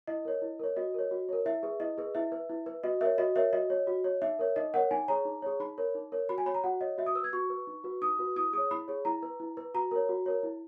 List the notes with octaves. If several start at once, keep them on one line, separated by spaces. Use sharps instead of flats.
E4 D#5
A#4 C#5
E4
A#4 C#5
F#4 D#5
A#4 C#5
F#4
A#4 C#5
E4 E5
G#4 B4
E4 D#5
G#4 B4
E4 E5
B4
E4
B4
F#4 D#5
A#4 C#5 E5
F#4 D#5
A#4 C#5 E5
F#4 D#5
C#5
F#4
C#5
D#4 E5
A#4 C#5
D#4 D#5
A#4 C#5 F#5
D#4 G#5
G#4 C#5 A#5
D#4
G#4 C#5
D#4 B5
A#4 C#5
D#4
A#4 C#5
F#4 B5
G#5
C#5 B5
A#5
F#4 F#5
C#5 D#5
F#4 E5
D#6
B4 E6
G#6
F#4 C#6
B4
D#4
F#4 B4
D#4 D#6
F#4 B4
E4 D#6
G#4 C#5 D#6
E4 B5
G#4 C#5
E4 A#5
B4
E4
B4
F#4 A#5
A#4 C#5
F#4
A#4 C#5
E4